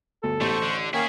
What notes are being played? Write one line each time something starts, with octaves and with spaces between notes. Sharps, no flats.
G1 D2 A4
A1 B2 A3 C5 C#6
D3
D#3 A#3 C#4 E4 G#4 C#5